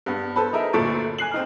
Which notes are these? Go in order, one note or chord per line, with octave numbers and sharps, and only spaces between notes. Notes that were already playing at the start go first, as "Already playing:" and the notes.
G2 B3
A4 B4 C5 A5 B5
D#4 G#4 A#4 E5
G1 D2 A#2 A4 C#6 D7
G#5 F#6 C7 F#7
C4 D#4 F6